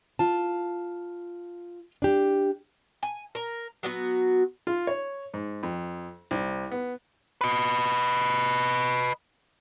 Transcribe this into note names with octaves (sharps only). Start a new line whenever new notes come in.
F4 A5
D4 G4
G#5
A#4
F#3 B3 F#4
F4
C#5
G#2
F2
C2
B3
B4 D#5